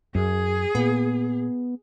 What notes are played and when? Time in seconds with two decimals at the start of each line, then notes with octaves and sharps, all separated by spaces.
0.15 F#2 G#4
0.75 A#2 B3